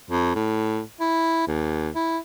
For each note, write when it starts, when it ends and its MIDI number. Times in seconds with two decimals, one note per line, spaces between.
0.10 0.32 41
0.35 0.81 45
1.00 1.45 64
1.47 1.89 39
1.95 2.18 64